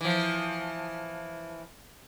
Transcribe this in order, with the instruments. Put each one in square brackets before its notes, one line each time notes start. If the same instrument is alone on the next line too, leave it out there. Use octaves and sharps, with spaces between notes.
[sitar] E3 F3